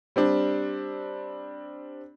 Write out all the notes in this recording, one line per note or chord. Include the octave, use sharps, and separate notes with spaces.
G3 C4 D4